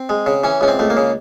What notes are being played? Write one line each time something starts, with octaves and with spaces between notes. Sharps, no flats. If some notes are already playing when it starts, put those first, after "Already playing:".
Already playing: C4
G#3
C#3
E3 C#4
C#2 C#4
C4
C#2 A3
A#3
C#3